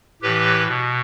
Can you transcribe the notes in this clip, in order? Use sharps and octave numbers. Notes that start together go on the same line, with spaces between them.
A2 E3 G4 B4
B2